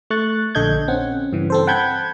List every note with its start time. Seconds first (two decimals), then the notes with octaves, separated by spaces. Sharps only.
0.10 A3 C#6 F#6 A6
0.55 A#1 D3 A4 D#5 G6 G#6
0.88 C4 C#4 F#5
1.33 G2 C#3 E3
1.50 C4 A4 C5
1.67 F#5 G5 A5 B5 G6 G#6